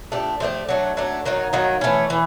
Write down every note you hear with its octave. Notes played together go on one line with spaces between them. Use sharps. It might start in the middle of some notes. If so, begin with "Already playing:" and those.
F3 A3 D4 G4
F3 A3 D4 G4
F#3 A3 D4
F#3 A3 D4
D#3 F#3 A#3 D#4
D#3 F#3 A#3 D#4
E3 A3 C#4
E3